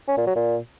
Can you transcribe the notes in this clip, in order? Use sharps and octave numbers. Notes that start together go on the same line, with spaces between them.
C#4
A#2
F#3
A#2